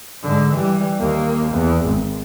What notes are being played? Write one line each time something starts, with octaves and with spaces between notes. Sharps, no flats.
G#2 D3
E3 G3
D#2 A#3
E2
G#1